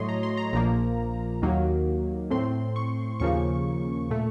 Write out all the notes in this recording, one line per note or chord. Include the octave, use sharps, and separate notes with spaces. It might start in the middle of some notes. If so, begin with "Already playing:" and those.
Already playing: A2 F#3 A3 C#5 D#5 C6
A#5
C6
A#5
A#1 A#2 F3 A#3 A#5
D#2 D#3 F#3 A#3
A2 A3 C4 C6
C#6
D#2 C#3 F3 A#3 C#6
A#2 A3